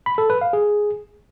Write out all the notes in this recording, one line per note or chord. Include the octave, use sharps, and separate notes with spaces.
B5
A4
B4
F5
G#4